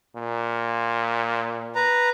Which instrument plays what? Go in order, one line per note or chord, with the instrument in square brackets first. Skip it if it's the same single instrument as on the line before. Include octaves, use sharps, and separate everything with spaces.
[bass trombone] A#2
[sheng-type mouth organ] B4 A#5